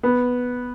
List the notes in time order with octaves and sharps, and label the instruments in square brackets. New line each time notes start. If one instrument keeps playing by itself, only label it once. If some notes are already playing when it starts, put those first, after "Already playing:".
[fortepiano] B3